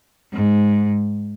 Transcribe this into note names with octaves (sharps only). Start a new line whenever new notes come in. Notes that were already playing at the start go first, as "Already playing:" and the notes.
G#2